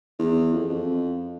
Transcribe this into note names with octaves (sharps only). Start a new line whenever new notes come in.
E2
F2
F2